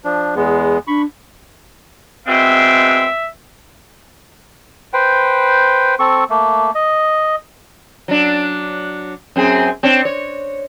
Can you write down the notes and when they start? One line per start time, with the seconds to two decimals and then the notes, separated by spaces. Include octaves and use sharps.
0.05 F3 D4
0.36 E2 G#3 B3 G#4
0.87 D4 B5 C#6
2.27 B2 G#3 C4 E5
4.93 B4 C5 G5
5.99 C4 A4 C#6
6.30 A3 A#3
6.75 D#5
8.08 F#3 D4
9.36 F#2 C4 G#4
9.83 C4 D4 C#5
10.05 C#5